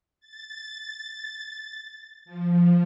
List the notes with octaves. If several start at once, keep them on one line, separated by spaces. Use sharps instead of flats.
A6
F3